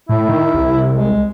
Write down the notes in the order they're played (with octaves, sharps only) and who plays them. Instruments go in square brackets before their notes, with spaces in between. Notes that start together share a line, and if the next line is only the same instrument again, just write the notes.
[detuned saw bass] A2 [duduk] E4
[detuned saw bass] D#3
C2
[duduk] G#3